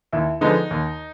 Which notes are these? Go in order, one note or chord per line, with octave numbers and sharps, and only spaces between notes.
D#2 E4
D3 F3 G#3 B3 D#4
D#2